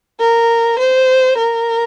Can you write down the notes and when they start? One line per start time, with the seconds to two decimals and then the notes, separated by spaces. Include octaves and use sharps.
0.20 A#4
0.79 C5
1.38 A#4